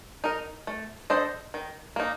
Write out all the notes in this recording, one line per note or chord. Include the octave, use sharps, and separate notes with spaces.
D#4 A#4
A3
D4 A4 C5 D#5
D#3
A#3 D#4